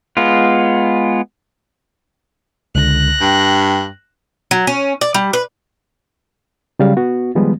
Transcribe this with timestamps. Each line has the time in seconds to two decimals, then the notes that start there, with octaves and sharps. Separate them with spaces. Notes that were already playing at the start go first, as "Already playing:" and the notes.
0.17 G#3 B3 F4
2.75 C#2 D3 F#6 A#6
3.21 G2 G5
4.51 F#3
4.67 C#4
5.01 D5
5.14 G3
5.33 B4
6.79 C#3 F#3 G3 F5
6.97 B3 F#4
7.35 D#3 F3 G3 G#3 B3